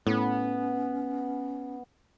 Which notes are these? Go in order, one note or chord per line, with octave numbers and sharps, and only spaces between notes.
A2 B3 C#4